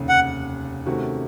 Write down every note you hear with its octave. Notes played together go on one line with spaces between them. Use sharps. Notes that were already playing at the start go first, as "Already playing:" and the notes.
Already playing: F1 D#2 C#3
F#5
C3 D#3 A3 C#4 F#4